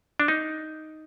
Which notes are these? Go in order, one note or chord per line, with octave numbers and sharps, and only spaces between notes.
D4
D#4